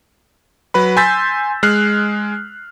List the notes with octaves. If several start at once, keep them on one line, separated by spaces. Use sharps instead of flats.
F#3 B4 B5
G#5 C6 E6 G6 A6 B6
G#3 F6 F#6 C7